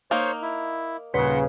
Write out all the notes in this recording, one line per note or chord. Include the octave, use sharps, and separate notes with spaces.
A#3 D#4 C5 C#5
E4
D#1 C#3 B4 F#5 C6 B6